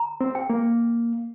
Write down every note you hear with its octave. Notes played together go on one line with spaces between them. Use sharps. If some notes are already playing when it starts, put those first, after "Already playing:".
Already playing: A#5
C4
G5
A#3